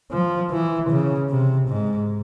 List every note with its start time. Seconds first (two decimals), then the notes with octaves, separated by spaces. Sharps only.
0.11 F3
0.51 E3
0.90 C#3
1.30 C3
1.69 G#2